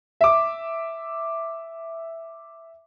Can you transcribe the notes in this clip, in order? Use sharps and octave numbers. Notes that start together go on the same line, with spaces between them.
E5 D6